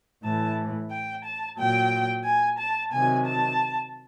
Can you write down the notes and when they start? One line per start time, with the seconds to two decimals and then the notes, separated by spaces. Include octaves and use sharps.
0.24 A2 E3 A5
0.92 G5
1.26 A5
1.59 A#2 F#3 G5
2.26 G#5
2.59 A5
2.93 C3 D#3 F#3 G#5
3.27 A5